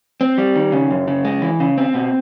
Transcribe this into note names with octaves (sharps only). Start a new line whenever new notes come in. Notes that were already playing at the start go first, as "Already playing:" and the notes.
C4
G3
D#3
C#3
F#2
C#3
G#3
E3
C#3
C4
B2